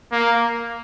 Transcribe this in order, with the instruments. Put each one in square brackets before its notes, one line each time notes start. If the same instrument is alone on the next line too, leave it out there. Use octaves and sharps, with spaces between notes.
[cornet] A#3